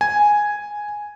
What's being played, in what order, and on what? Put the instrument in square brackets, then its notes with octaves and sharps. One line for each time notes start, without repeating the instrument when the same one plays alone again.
[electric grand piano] G#5